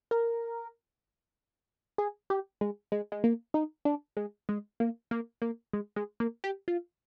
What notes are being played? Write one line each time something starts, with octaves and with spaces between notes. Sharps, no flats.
A#4
G#4
G4
G#3
G#3
G#3
A#3
D#4
D4
G#3
G#3
A#3
A#3
A#3
G#3
G#3
A#3
G4
F4